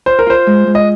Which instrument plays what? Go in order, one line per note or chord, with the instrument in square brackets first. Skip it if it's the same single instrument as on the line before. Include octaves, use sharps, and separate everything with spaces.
[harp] F4 [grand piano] C5
[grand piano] A#4
[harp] F4 [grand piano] C5
[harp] G#3
G#3
[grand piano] D#5